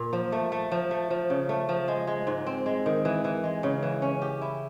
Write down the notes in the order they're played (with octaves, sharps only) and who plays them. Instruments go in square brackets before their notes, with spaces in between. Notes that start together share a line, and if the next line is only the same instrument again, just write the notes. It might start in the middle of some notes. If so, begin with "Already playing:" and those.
Already playing: [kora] A#2
F3
A3
A3
F3
A3
F3
C#3
A3
F3
G#3
G#3
G#2
C4
G#3
D#3
E3
E3
G#3
C#3
E3
C#4
G4
E4